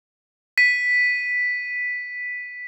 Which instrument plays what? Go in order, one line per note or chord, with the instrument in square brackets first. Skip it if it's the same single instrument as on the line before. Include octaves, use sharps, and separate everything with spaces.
[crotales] B6 D#7